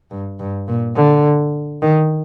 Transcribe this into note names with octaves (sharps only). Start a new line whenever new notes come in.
G2
G2
A#2
D3
D#3